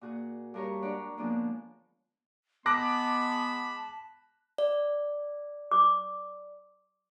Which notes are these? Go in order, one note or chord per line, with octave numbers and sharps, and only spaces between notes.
A#2 F#4 G#4
G2 G#4 A#4 B4 C#5 A#5
G#3 D4 C#5 D5 F#5
D3 F3 G#3 A#3 B3 D4
G#3 B3 A5 B5 D6 F#6 A#6
D5
D6